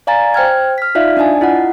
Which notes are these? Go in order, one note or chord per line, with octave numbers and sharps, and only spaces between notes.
D5 F5 G#5 A#5 A6
C5 G5 F6 G#6
F6 B6
D#4 F4 D5 E5 F5
D4 D5 D#5 G#5 A5
E4 F4 D#5 F#5